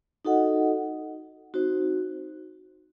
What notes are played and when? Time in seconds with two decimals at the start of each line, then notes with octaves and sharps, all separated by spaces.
0.25 D#4 F#4 A4 D#5 F#5
1.54 C4 D#4 F#4 C5